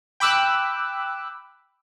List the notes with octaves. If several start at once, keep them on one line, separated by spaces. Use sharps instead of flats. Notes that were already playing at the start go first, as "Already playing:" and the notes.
G5 B5 D6 E6 F#6